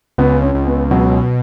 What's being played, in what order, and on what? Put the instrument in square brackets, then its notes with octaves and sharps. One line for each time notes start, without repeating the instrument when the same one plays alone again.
[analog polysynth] C#2 [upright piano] B3
[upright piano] C#4
[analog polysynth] C#2
[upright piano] B3
[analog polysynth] B2 [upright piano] F#3